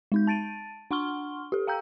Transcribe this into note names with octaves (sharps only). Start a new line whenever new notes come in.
G#3 D#4 G6
A5 A6 D7 D#7
D4 F#5 C6 C#6 F6 G7
G4 A4
F5 G5 A#5 E6 G6